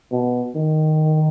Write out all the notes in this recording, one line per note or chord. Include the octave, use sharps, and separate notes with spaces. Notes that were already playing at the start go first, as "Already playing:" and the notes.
B2
D#3